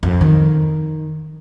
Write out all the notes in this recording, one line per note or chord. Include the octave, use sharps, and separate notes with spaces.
F2
D#3